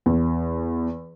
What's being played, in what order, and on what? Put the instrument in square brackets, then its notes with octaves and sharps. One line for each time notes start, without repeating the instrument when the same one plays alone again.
[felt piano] E2